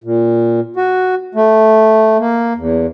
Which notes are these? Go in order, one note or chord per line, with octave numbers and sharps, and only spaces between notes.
A#2
F#4
A3
A#3
E2